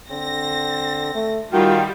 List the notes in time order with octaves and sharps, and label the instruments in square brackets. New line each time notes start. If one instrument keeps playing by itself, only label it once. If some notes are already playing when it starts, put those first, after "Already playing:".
[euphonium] D3 [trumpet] C4 [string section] A#6
[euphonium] A3
[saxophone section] D#3 F4 [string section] G3 [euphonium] F#4 [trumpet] G5